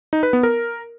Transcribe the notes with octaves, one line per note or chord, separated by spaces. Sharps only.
D#4
B4
B3
A#4